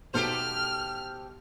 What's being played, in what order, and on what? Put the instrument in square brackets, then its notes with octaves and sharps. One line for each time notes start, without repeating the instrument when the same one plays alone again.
[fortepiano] B1 [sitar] G4 A4 C5 [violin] F6